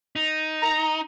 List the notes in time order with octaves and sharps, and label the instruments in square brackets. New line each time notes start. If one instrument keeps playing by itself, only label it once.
[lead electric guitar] D#4
[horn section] A#5